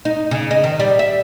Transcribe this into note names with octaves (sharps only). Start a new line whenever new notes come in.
D#4
C#3
D#4
D#3
G3
E5